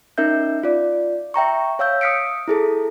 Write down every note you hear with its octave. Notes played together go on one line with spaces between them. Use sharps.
C#4 D#4 A#4 E5 G6
F4 D5
E5 G5 A#5 C#6
C#5 F5 E6 G6
D#6 F6 B6 C#7 D7
E4 G#4 A4